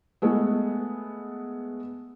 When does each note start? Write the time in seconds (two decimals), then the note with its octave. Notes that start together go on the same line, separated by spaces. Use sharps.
0.22 G#3 A3 B3